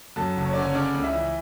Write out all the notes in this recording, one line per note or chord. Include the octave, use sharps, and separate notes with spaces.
F#2 A4 A5
F#1
C#5
D3 D5
C#4 C#5
C#3 D4 D5
C#2
E4 E5
E3